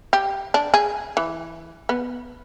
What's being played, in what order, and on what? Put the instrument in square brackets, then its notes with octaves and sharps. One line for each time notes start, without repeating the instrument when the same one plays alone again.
[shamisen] G4
D4
G#4
E3
B3